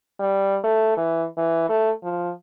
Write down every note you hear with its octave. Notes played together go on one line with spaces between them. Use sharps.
G3
A3
E3
E3
A3
F3